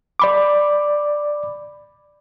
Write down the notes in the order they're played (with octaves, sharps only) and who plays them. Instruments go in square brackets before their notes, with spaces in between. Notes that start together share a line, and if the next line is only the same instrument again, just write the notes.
[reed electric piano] D5 B5 D6